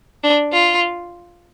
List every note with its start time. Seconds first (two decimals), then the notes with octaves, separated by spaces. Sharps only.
0.22 D4
0.51 F4